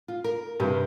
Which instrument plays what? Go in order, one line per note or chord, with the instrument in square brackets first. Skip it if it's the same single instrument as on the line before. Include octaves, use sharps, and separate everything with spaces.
[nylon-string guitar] F4
A#4
[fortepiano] G2 [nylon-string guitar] C3